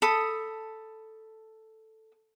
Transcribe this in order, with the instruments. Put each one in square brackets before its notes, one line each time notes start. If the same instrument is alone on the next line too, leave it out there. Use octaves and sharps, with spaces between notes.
[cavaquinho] A4 B5 D#6